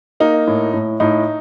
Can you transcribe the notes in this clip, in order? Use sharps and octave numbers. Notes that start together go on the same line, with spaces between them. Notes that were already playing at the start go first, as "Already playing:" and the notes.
A#3 D#4
A2
A2
A2 D#4